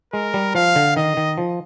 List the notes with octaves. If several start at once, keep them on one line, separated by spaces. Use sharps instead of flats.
G#3 A#4
G3
F3 F5
D3
D#3 D#5
D#3
F3